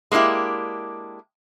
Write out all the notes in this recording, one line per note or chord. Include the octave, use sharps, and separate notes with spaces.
G#3 A#3 D4 E4 G4